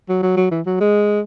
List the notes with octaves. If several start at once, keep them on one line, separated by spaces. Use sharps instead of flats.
F#3
F#3
F#3
E3
F#3
G#3